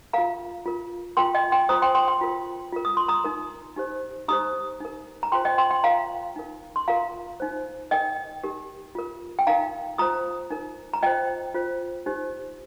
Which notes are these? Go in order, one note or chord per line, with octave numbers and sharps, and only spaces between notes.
F4 A#4 F5 A#5
F4 A#4
F4 A#4 G5 C6
D#5 G5
G5 C6
F4 C5 A#5 D#6
G5 C6
G5 C6
G5 C6
F4 A#4
F4 A#4
D#6
C6
A#5 D#6
D#4 A#4
D#4 G4 C5
D#4 G4 C5 A#5 D#6
D#4 A#4
A#5
F4 C5 G5 C6
D#5 G5
G5 C6
G5 C6
F4 A#4 F5 A#5
D#4 A#4
C6
F4 A#4 F5 A#5
D#4 C5
D#4 A#4 D#5 G5
D#4 G4 A#4
F4 A#4
G5
D#4 A#4 F5 A#5
F4 C5 A#5 D#6
D#4 A#4
A#5
F4 C5 D#5 G5
F4 C5
D#4 G4 C5